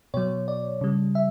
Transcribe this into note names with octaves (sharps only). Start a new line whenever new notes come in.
B2 F#3 C#5
D5
C#3 G3
E5